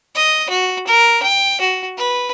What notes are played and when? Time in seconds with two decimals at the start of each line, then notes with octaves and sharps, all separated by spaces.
0.15 D#5
0.50 F#4
0.87 A#4
1.23 G5
1.61 F#4
1.98 B4